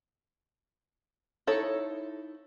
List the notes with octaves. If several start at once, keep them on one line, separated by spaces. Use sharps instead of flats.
D#4 E4 A4 C#5